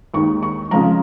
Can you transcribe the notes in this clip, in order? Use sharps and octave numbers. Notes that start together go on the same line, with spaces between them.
D#2 D#3 G#3 C#6
C#6
F2 C#3 F3 G#3 A#5